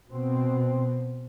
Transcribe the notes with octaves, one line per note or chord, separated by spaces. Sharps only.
B2 C4